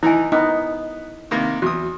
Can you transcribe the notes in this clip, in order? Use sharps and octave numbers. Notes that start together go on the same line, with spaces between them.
E3 D#4 E4 G#5
B3 D#4
C3 D#3 A#3
E2 F#4 D#6